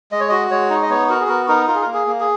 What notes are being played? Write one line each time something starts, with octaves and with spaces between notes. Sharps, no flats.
G#3 D#5
C#5
F#4 D#5
G#3 C#5
D#4
D#5
B3 C#5
F#4 A#4
G#4
B3 A#4
D#4 A#4
F4 A#4
G#4
A#4
A#3
G#4
A#3
G#4